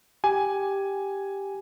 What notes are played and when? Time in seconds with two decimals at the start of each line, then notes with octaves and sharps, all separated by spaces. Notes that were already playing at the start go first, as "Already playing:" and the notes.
0.24 G4 G#5